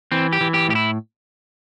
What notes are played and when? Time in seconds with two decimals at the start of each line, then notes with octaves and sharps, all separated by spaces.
0.12 E3 C4
0.33 G4
0.41 E3
0.54 G4
0.68 A2 G4
0.75 E4